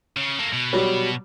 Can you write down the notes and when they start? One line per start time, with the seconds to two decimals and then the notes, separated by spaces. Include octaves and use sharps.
0.17 C#3
0.39 A#3 A4
0.53 B2
0.73 F#3 G3